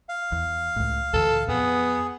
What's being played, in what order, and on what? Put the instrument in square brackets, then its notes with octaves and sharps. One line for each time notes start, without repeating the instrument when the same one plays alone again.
[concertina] F5
[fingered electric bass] E2
C#2 A2
[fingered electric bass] D2 A#2 E3 [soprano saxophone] A4
[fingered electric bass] F2 [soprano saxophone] B3 [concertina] G#4